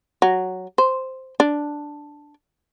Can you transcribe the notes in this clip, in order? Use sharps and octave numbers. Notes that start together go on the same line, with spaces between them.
F#3
C5
D4